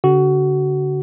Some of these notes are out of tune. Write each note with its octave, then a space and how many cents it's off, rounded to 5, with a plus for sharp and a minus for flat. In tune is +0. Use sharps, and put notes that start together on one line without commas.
D3 -45 F#4 +20